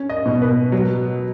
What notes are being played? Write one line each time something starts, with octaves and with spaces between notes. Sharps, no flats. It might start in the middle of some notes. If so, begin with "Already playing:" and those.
Already playing: C#4
D#5
B2
B4
F#3